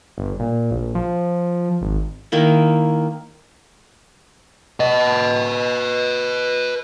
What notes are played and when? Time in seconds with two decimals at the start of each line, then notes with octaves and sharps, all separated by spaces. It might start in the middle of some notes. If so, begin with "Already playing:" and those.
0.18 G1
0.40 A#2
0.71 A#1
0.95 F3
1.81 G#1
2.32 D#3 A#3 E4
4.80 B4 D#5